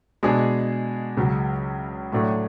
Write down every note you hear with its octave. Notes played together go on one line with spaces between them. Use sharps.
B2 G#3 D4 G#4
C#2 C#3 F#3
A2 F#3 A3 D4